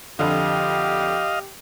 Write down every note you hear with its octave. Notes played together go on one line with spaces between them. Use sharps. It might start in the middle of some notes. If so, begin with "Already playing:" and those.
F2 D3 G4 D#5 F5